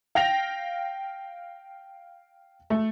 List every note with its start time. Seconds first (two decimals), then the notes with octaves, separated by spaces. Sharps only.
0.15 F5 G5 A#6 F7
2.70 A3